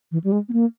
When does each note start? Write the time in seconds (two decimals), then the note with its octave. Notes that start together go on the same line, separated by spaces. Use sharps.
0.12 E3
0.24 G3
0.32 G#3
0.49 B3
0.53 A#3